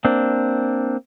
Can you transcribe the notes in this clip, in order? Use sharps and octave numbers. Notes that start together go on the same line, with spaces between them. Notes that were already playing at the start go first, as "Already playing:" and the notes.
A#3 C4 D4